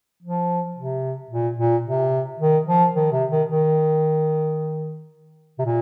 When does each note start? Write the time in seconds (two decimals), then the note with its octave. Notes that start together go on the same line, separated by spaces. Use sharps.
0.23 F3
0.76 C3
1.31 A#2
1.58 A#2
1.85 C3
2.39 D#3
2.66 F3
2.95 D#3
3.12 C3
3.30 D#3
3.49 D#3
5.59 C3
5.65 A#2